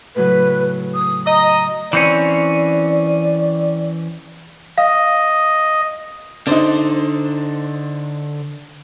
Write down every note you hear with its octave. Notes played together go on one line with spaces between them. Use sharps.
A2 C#3 F#3 B4
D#6
D#5 A#5
E3 C4 C#4 D5
D#5 F5
D3 D4 D#4 C5